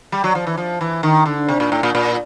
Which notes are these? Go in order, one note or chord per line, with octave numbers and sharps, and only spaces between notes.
G3
F#3
F3
E3
F3
E3
D#3
D3
C3
A#2
A2
A#2
A#2